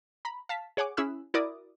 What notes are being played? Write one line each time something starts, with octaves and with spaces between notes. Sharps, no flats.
A#5 B5
F5 A5 B6
G#4 C#5 F#5 G#5 D6
C#4 E4 G#4 B5 E6 F#6
E4 F#4 A#4 D5 D6 D#6